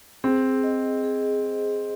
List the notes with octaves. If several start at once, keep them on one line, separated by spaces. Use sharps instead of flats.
C4 G#4
D#5
G#4
C5